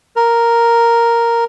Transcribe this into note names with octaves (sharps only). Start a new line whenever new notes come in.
A#4